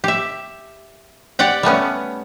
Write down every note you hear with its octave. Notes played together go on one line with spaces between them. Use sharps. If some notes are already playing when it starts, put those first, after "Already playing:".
G4 E5
G4 D5 F#5 G5
G3 A3 B3 C#4